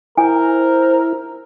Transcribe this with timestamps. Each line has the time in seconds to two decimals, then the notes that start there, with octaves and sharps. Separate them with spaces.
0.18 E4 A#4 C5 G#5